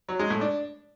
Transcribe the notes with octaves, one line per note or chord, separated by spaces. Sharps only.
F#3
G#3
A2
D4